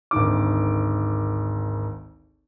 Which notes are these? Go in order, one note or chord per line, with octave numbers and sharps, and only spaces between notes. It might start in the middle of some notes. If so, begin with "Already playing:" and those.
G#1 D2 D#3 D6